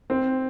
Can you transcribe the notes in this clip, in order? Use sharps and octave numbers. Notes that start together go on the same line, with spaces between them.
C4